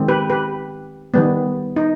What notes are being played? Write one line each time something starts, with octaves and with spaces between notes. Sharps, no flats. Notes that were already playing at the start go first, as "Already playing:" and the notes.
Already playing: D#3 G#3 C4
G4 B4
G4 B4
D#3 G3 B3
D#4